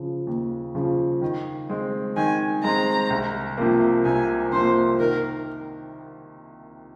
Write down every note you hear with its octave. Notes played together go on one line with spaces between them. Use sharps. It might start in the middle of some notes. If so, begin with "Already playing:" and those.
Already playing: C#3 F3
D#2
C#3 F3
D#3
G#3 C4
D#3 G#5
G#3 C4 A#5
C2
C3 F3 A#3
C2 G#5
C3 F3 A#3 C5
D#3 A#4